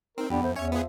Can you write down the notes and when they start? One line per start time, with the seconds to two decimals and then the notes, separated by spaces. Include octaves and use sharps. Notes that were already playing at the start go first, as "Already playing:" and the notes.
0.18 C4 D#4 A#4
0.30 F2 B3 D4 G4
0.43 A3 C5
0.56 E2 C#4 C#5 E5
0.72 F3 B3 G#4